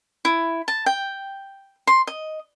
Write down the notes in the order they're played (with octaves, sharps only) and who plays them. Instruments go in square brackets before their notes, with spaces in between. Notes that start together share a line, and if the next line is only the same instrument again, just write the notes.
[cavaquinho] E4
A5
G5
C6
D#5